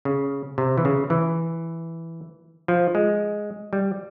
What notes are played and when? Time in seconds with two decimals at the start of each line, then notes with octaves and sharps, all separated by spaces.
0.05 C#3
0.58 C3
0.78 E3
0.85 C#3
1.10 E3
2.68 F3
2.95 G#3
3.73 G3